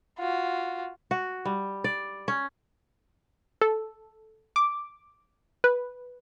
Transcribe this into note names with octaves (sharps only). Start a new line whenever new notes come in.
F4 F#4
F#4
G3
D5
C#4
A4
D6
B4